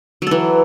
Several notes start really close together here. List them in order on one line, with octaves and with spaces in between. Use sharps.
F#3 A4 E3